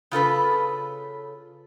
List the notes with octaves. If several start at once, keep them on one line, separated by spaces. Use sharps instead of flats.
C#3 F4 A4 B4